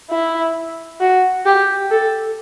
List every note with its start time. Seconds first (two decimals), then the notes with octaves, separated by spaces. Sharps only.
0.11 E4
1.00 F#4
1.46 G4
1.91 A4